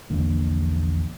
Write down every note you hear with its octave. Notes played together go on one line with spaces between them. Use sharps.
A#1 E2 D3 A#3